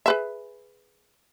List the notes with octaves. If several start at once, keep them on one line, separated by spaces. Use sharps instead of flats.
G#4 B4 E5